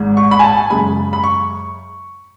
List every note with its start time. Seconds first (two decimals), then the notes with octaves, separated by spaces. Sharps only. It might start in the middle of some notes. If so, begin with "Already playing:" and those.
Already playing: G#1 G#2 G#3
0.17 C#6
0.31 B5
0.39 G#5
0.44 A5
0.57 G#5
0.70 F#2 C#3 G#3 B5
1.13 B5
1.24 C#6